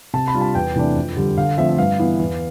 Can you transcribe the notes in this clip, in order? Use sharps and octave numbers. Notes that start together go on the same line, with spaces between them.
C3 A5
B5
G3 D4 F4
A5
E2 G5
C3 E3 A3 D4
F2
D3 G3
D3 F5
F3 A3 C4 F4 E5
E5
G2 F5
E3 B3 E4
E2